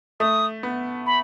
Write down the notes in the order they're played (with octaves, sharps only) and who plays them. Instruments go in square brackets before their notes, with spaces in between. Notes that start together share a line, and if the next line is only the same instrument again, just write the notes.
[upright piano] A3 [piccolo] D#6
[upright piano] B3
[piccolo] B5